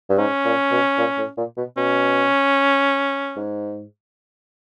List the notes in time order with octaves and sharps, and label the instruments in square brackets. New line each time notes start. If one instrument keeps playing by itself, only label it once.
[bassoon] G2
[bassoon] G#2 [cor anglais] C#4
[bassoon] A#2
B2
A#2
A2
A#2
B2
[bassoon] B2 [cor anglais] C#4
[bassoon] G#2